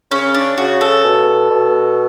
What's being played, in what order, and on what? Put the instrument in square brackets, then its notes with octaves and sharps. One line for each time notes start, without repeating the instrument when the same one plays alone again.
[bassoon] C#3 [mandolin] C#4
[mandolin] D4
[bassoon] C#3 [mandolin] F#4
[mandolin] A4
[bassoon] B2
B2